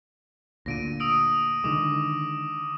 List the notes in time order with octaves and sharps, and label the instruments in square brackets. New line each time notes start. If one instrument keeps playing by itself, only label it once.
[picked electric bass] D2 A#2 D3 [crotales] A#6 D7 D#7
[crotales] D#6 E6 D7
[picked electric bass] D3 D#3 G#3 [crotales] D6 D#6